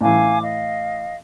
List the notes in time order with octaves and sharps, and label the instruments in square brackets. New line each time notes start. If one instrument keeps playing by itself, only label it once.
[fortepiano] A2 E3 [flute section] F5 G#5 D6
[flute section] D#5 F5